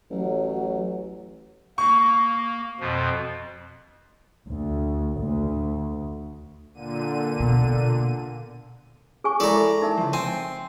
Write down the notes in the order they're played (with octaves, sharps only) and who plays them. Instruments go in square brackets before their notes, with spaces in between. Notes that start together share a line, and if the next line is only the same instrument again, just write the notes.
[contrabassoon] A1 [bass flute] F#3
[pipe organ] A#3 [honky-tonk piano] C#6
[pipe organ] F2 B2 F3
[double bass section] D2
D2
[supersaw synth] A#2 D3 D#7
[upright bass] B2
[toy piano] G#4 G#5 C#6
[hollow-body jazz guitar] G#3 E4 A4 [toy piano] A#4 [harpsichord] D5 A#5
[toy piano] D#4 A#4 E5
[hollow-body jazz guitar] C#3 F3
[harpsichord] C4 [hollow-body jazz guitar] G#5